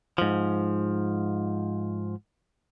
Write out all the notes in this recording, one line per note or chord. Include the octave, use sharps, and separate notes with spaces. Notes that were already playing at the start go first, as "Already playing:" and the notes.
G#2 F3